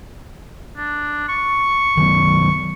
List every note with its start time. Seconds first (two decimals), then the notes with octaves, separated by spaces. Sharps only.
0.77 D4
1.29 C#6
1.97 D#3 F#3 B3